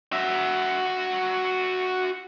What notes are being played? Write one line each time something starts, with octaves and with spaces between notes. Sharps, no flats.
F#4 E5